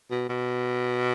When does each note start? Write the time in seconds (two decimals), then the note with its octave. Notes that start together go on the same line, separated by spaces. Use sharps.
0.11 B2
0.29 B2